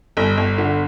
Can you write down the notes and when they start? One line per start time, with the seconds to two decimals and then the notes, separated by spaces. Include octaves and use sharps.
0.17 G1
0.37 G1
0.58 D3